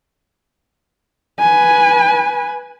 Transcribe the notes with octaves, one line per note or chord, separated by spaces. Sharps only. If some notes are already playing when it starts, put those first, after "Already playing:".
B4 G#5